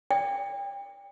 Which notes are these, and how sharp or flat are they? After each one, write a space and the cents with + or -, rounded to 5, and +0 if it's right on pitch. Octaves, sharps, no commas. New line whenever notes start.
D5 -30 G5 +30